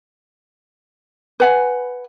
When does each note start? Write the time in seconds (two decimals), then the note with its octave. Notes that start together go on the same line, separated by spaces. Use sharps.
1.40 B4 F#5 G#5